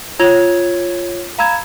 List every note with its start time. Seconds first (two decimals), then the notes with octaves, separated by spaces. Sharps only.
0.20 F4 C#5 E6 G#6 F7
1.38 F5 A#5 B5 E6 G#6 E7